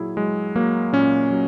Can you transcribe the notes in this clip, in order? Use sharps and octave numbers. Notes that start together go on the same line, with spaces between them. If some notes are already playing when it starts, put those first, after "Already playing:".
Already playing: A#2 F#3 E4 G#4
F#3 G#3
F#3 A#3
A#2 C#4
F#3